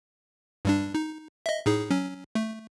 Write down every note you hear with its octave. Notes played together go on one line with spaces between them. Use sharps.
G2 G3 D4
D#4
D#5 E5
A2 D#4 G#4
F#3 C#4
A3